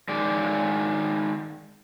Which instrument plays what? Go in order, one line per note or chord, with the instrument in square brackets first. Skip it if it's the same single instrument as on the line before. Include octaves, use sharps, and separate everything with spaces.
[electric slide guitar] D#3 G#3 D5